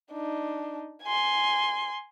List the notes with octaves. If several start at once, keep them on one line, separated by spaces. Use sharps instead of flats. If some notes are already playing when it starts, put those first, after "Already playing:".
D4 D#4
G#5 C6